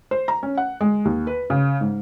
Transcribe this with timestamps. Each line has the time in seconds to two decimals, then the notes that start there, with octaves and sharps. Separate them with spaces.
0.11 C5
0.28 A#5
0.43 C#4
0.57 F#5
0.81 G#3
1.05 D#2
1.27 B4
1.50 C#3
1.81 G#2